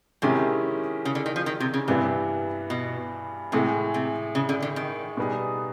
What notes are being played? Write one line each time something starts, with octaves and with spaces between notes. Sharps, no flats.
C3 D#3 G#3 C#4 E4 G4
C#3
D3
D#3
F3
D#3
C3
C#3
G2 C3 E3 G3 B3
B2
A2 C3 E3 G#3
C3
C#3
D3
D3
D#3
B2 G3 B3 D#4 G#4